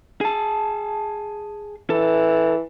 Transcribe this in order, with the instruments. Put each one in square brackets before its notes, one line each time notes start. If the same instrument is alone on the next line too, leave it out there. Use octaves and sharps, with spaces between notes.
[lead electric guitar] G#4 A5
[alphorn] E3 [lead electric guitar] A4